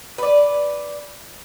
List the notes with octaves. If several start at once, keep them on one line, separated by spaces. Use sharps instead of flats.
B4 D5